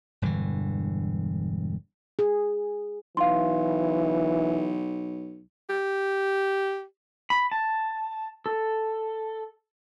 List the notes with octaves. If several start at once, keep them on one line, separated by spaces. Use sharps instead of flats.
E1 G2 D3 E3
G#4
B1 E3 F5 C6
G4
B5
A5
A4